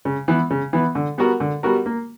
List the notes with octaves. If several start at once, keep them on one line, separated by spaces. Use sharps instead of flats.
C#3
E3 B3
C#3
E3 B3
D3
G3 B3 F#4 A#4
D3
G3 B3 F#4 A#4
A#3